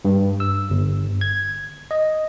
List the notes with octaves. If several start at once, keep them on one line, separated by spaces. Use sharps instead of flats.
G2
E6
G1
G#6
D#5